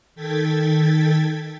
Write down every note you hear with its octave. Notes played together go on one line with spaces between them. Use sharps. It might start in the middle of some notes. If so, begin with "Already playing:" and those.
D#3 A4 G5 G#6 A6 B6